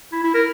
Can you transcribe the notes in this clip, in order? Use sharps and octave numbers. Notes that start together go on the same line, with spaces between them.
E4
E4
A#4